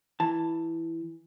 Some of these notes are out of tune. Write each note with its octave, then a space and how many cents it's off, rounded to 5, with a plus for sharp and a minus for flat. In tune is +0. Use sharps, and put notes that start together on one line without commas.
E3 +0 A5 +10